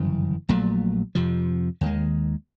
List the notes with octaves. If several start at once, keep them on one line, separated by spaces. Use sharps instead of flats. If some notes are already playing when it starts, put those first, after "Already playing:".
Already playing: G1 F#2 C#3 E3
A#1 A#2 F#3 A3
F2 C3 F3
D#2 D#3 G#3